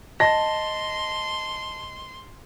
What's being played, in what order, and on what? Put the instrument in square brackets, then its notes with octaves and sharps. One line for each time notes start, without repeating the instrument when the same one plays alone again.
[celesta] D#5 [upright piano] A5 A#6 [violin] C6